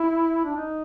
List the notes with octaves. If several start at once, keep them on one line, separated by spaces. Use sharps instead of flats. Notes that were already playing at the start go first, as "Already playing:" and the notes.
Already playing: E4
D4
D#4